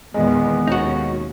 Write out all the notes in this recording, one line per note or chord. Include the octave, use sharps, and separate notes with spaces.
E2 A#2 D#3 G#3 B3
D#2 B2 C#4 D#4 F#4